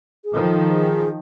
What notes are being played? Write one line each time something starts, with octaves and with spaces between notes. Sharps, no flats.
G#4
D#3 F3 A4
G#4